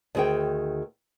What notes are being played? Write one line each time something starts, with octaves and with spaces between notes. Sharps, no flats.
D2 D#3 G#4 A#4 G5